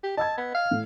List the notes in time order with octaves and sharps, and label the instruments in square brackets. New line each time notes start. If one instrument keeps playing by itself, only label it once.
[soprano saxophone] G4
[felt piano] D#5 E6 G#6 [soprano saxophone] A5
[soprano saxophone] B3
F5
[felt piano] A2